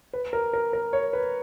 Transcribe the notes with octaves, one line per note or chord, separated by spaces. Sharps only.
B4
A#4
A#4
A#4
C#5
B4